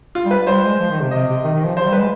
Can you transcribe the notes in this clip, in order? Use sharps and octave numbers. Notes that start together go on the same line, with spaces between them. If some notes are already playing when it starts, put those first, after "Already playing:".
F4
G3
B4
G3 C5
G#3
F3
D#3
C3
C3 D#5
C3
D#3
D#3
F3
F3 C5
G3
B4
G#3